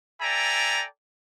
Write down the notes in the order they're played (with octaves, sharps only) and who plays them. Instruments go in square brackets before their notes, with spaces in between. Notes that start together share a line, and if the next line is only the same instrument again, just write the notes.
[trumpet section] A4 D5 E5 G5 G#5 A#5